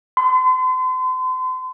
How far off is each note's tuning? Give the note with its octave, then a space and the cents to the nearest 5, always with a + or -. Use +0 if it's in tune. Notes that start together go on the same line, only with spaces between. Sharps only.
C6 -40